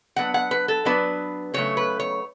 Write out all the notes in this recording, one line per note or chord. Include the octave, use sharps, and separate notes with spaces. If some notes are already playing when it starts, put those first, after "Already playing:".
F#3 B3 D4 F#5
F#5
B4
A4
F#3 B3 D4 B4
C#3 F#3 A3 C#5
B4
C#5